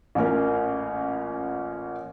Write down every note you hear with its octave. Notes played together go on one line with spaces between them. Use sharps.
A1 A#2 C#4 A#4